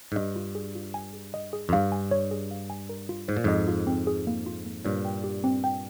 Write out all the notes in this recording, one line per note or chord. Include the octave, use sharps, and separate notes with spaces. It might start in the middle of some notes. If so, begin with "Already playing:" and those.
G#2
G2 D#5
F4
G#4
F4
G#5
G#4
D#5
G#4
F2
G2 F5
G#5
C#5
G#4
F5
G#5
A#4
F4
G#2 C5
A#2
F2 G#2 D#5
F4
C4
G#4
A#3
F4
A#3
G2 A#2 C#5
G5
G4
C4
G5